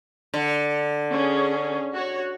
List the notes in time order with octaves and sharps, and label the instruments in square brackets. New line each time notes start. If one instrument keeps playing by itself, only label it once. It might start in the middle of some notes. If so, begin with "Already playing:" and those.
[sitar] D3
[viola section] C#4 G#4
F#4 C#5